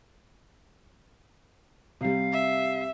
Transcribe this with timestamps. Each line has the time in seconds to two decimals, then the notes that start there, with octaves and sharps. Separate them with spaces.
2.01 C3 G3 F5
2.33 E5